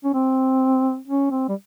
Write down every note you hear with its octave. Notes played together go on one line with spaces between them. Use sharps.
C#4
C4
C#4
C4
G3